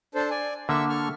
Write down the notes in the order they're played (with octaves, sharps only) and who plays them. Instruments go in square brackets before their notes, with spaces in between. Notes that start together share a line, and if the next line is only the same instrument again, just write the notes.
[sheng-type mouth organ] D4 A4 C5
D5 G#5
[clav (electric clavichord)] D3 A#3 [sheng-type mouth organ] E5 C#6 E6
[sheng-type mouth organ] A4 C#6 F6